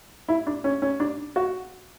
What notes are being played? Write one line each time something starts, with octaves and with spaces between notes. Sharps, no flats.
E4
D4
C#4
C#4
D4
F#4